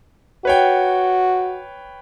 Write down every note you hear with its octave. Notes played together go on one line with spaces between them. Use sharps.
F#4 B4 C#5 G5